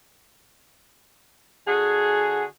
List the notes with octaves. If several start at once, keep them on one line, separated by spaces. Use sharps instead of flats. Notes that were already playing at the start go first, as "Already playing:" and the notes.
D3 F#4 G#4